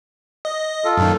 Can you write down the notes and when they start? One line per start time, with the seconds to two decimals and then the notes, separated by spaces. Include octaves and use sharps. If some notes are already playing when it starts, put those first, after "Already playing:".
0.45 D#5
0.85 F4 A4
0.97 F#2 A#2 D#3